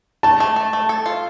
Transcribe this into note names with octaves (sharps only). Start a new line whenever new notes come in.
A3 A5
A3
A3
A3
A4
F4